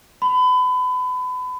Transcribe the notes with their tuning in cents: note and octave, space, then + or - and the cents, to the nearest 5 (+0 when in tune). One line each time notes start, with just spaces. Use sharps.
B5 +30